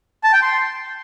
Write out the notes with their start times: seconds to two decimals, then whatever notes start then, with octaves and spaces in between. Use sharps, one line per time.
0.24 A5
0.33 G5
0.42 C6